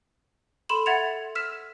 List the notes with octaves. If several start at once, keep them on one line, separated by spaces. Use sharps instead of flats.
A4 B5 C6 E7 F#7
E5 F#5 G#6 A6 C#7 F7
E6 F6 B6 E7